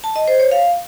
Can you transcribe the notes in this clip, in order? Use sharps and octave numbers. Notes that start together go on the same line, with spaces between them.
A5
D#5
C5
C#5
F5